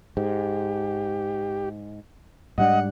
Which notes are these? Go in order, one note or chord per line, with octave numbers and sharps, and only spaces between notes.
G#2 G4
G#2 G3 D4 D#5 F#5